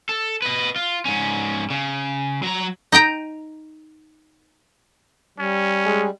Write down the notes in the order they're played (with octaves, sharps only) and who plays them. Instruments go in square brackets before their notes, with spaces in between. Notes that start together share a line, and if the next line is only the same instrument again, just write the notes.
[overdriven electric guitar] A4
B4 D#5
F4
G#2 C#4
C#3
F#3 A#5
[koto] D#4 D#5 G5 A#5
[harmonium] G3 [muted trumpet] C#4
[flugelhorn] G#3